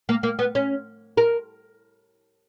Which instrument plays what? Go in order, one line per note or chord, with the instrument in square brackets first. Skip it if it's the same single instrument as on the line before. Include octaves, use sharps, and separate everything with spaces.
[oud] A#3
A#3
B3
C#4
A#4